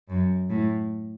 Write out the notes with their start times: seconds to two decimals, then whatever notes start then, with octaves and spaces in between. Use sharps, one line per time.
0.09 F#2
0.50 A2